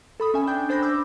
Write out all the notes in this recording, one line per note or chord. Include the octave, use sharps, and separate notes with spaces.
A4 B5 D#6
C#4 E5 G#5
D4 G5 G6
D4 C5 B5 G6 A#6
D6 E6